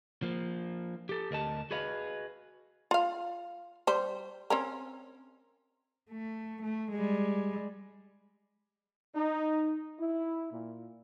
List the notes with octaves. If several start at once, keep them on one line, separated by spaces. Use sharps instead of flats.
F3 A#3
G4 A4
D2 A#4 D#5 A5
F#4 G#4 B4 D#5 F5
F4 F5
G3 C5
C4 C#4 A#4
A3
A3
G3 G#3
D#4
E4
A#2